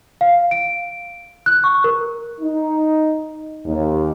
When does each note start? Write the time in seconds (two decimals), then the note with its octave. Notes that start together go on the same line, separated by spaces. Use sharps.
0.21 F5
0.51 D7
1.46 F#6
1.64 C#6
1.84 A#4
2.40 D#4
3.65 D#2